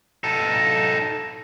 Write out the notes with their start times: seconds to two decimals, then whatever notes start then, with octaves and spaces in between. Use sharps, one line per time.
0.24 D#4 A4